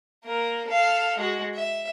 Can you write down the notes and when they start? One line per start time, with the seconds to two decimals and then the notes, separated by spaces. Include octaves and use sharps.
0.25 A#3 A#4
0.68 A4 F5
1.18 G#3 F#4
1.55 E5